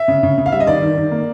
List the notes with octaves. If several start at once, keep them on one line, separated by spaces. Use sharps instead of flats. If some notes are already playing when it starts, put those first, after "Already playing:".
Already playing: E5
C#3
C#3
C#3
F5
G3 E5
D#5
D#3 D5
D#3
D#3
A#3